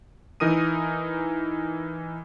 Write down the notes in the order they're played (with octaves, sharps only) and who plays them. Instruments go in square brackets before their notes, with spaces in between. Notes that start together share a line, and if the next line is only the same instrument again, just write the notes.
[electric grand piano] E3 D#4 A#4 D#6 D#7